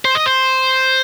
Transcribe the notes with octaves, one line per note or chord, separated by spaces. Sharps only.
C5
D#5
C5